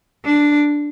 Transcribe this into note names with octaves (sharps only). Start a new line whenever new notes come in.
D4